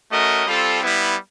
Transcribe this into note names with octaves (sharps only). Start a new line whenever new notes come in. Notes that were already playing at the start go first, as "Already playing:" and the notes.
A3 C#4 F#4 A#4 D#5
G3 C4 F4 A4
G3 B3 E4